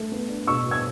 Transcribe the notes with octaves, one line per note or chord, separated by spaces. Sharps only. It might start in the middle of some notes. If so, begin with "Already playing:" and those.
Already playing: A3
B3
D4
B2 C#6 E6
B2
E6 G#6